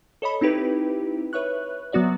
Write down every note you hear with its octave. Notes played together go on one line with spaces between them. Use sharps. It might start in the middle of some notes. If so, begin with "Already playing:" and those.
A4 C#5 D#5 B5
C4 D#4 E4 G4 B4
B4 C#5 E5 C#6 F#6
F#3 B3 F#4 D5 E5